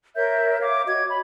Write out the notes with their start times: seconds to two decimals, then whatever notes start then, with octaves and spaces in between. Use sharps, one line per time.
0.16 A#4 C#5 E5 G6
0.60 C#5 E5 F5 D6
0.86 F#4 D#5 D6 G#6
1.09 C#5 B5